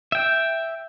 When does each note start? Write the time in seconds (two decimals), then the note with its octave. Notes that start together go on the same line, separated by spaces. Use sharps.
0.12 E5 G5